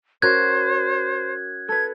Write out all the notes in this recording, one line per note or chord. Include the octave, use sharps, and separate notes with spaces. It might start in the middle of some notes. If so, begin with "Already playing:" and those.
C#4 F#4 A#4 C5 F#6 G#6
A4 B4 G#6